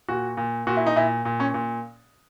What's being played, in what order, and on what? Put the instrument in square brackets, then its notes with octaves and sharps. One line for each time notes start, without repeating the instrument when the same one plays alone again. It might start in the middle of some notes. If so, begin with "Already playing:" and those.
[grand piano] A#2 F#4
A#2
A#2 F#4
E4
D#4
A#2 E4
A#2
C#4
A#2